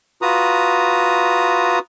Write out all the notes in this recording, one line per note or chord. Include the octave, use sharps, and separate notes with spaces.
F4 F#4 B4 A#5 D#6